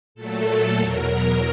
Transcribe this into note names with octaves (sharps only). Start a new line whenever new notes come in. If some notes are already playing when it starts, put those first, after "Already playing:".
A#2 F#3 A3 A4
E2 B2 F#3 A#4